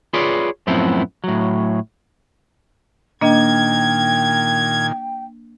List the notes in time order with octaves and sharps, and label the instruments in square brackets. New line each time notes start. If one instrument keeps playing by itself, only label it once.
[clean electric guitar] F4 G#4 B4 C#5 D5
F#2 A2 F3 B3 C4 E4
A2 F#3
[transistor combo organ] A#2 D#3 [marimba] A#3 D4 D#5 [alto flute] G5 [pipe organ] G#6